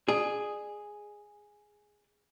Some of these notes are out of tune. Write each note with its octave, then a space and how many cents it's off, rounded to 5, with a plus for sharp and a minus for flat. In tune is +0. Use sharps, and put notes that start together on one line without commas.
G#4 +0 D5 +40